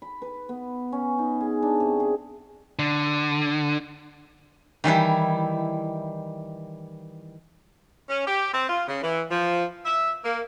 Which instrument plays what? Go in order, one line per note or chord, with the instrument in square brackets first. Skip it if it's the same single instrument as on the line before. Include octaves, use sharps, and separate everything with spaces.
[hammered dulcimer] B5
B4
B3
C#4
D#4
G#4
D4
C3
G#4
[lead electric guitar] D3
[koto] D#3 E3 G3 E4
[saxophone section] C#4
G4
C4
F4
C#3
E3
F3
E5
A#3